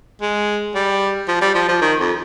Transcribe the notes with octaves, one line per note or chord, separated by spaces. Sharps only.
G#3
G3
F3
G3
F3
F3
D#3
F2